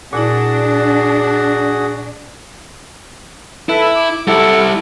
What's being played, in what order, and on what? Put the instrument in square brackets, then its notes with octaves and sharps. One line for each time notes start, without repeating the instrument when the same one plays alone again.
[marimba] A#2 E4 [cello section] D4 [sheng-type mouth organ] F#4 G#4 F#5
[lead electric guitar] E4 [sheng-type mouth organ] A4 B4
[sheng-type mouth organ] D6
[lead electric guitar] G3 E4 [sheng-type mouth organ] A4 F#5